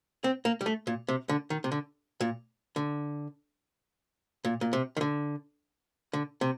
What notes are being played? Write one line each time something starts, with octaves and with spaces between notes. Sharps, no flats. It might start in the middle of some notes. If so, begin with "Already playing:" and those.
C4
A#3
G3
A3
A#2
C3
D3
D#3
C3
D3
A#2
D3
A#2
A#2
C3
D#3
D3
D3
C3